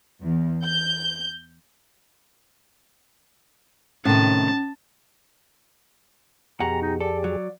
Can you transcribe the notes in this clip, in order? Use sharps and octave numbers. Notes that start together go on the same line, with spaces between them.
E2
G6
A2 C3 D#3 C#4 A5
F2 B2 G4 G#4 F#5 A#5
D#4
A4 D5
F#3